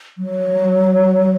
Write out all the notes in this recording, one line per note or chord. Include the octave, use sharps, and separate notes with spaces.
F#3